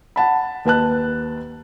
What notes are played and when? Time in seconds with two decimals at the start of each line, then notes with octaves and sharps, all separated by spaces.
0.16 F#5 A5 B5
0.65 D#2 B4 A5 F#6